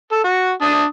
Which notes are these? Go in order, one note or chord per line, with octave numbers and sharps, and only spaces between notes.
A4
F#4
D4 D#6